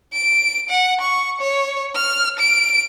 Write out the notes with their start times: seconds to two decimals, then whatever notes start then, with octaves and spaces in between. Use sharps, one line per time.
0.13 D7
0.69 F#5
1.01 C#6
1.41 C#5
1.96 F6
2.39 D7